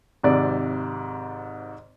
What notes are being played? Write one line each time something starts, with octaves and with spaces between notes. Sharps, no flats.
G#1 G#2 C3 D5